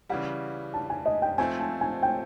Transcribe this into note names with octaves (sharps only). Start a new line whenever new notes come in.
C#3 E3 G3 F#5
A5
G#5
D#5
G5
F3 A3 C4 G#5
A5
G#5
G5